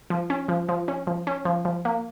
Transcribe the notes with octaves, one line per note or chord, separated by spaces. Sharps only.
F3
C#4
F3
F3
C#4
F3
C#4
F3
F3
A#3